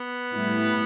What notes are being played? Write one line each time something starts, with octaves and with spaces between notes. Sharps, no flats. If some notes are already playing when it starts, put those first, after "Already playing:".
Already playing: B3
A2 G3 E4